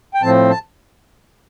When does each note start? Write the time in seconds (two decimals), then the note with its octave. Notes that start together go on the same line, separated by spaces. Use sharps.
0.14 G5
0.22 A2 F3 C4 A5
0.50 A5